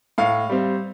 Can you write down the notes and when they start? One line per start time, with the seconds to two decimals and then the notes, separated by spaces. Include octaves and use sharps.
0.18 A2 F5
0.50 G3 C4